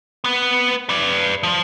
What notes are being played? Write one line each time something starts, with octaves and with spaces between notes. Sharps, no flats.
B3 B4
B4 D5
F3